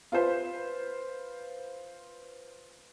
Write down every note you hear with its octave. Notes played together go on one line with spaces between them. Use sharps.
F4 B4 C5